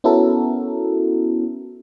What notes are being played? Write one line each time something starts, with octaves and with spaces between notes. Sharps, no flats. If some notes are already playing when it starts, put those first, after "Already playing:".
B3 C#4 E4 F#4 A4 A#4